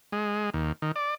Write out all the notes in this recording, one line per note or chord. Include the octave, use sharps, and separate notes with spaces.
G#3
D#2
D#3
D5